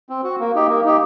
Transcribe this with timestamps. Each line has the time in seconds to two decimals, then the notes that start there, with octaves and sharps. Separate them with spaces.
0.09 C4
0.24 F#4
0.40 A#3
0.55 D#4 G4
0.69 A#3
0.85 D#4 G4